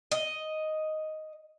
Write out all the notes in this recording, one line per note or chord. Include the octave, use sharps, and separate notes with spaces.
D#5